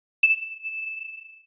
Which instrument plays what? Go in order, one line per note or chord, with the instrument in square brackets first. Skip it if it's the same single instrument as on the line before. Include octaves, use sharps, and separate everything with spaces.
[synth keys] E7